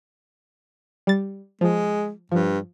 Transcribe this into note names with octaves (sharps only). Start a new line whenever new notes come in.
G3 A6
F3 G#3
G2 F3